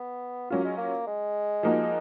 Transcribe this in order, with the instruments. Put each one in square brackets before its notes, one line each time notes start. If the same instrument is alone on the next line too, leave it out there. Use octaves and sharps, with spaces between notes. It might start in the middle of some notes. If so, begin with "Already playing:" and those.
Already playing: [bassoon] B3
[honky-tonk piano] F#3 C#4 F4 [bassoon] A#3
[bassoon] G#3
A#3
G#3
[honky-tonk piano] F3 A#3 D#4 F#4